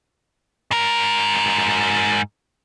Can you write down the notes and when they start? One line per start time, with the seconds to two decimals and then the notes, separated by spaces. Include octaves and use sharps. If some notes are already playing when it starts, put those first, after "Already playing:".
0.71 G#2 A#4